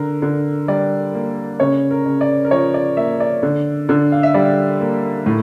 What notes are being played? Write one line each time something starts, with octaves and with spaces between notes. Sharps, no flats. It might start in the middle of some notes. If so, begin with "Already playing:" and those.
Already playing: D3 A#4
D3
G3 D5
A#3
C#3 C#5
A#4
C#3
D5
A#4
F3 C#5
D5
A#3 E5
D5
D3
D3
F5
E5
G3 D5
A#3
A2